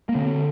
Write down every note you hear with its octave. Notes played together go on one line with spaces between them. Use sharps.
A#3
D3 C4